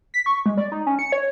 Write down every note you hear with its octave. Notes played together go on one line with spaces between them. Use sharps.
B6
C#6
G#3
D5
D#4
C#4
C#7
C#5